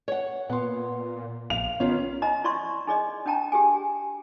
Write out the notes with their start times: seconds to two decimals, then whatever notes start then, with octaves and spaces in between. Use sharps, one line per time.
0.08 C#5 F#5
0.49 A#2 B3 F#5 C6
1.50 A#1 F5 F7
1.80 D#3 B3 C#4 F4
2.22 D#4 D#5 E5 A#5
2.44 E4 D5 E5 C6 C#6
2.87 D#4 G#4 D5 D#5
3.26 D4 D#4 G5 A5 A#5
3.52 G4 G#4 G#5